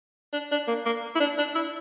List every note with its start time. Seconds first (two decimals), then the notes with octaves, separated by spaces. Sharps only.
0.33 D4
0.51 D4
0.68 A#3
0.86 A#3
1.15 E4
1.20 D4
1.38 D4
1.55 E4